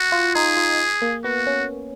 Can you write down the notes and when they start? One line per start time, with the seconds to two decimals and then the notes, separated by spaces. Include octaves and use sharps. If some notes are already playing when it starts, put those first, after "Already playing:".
Already playing: F#4
0.12 F4
0.35 D#4 G#4
0.57 F4
1.02 A#3
1.24 B3 F#4
1.47 C#4